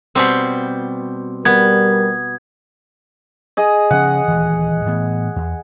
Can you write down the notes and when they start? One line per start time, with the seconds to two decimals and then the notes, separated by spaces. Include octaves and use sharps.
0.15 B2 G3 C4
1.45 G3 B3 A#4 G#6
3.57 G#4 D#5
3.91 C#3 F3 C#4 F#5
4.28 D#1 D2 E3
4.86 A2 E3 B3
5.36 E2